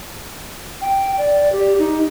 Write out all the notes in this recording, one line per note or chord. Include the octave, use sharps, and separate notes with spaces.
G5
D5
G4
D#4